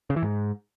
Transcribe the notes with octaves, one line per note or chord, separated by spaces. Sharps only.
C#3
E3
G#2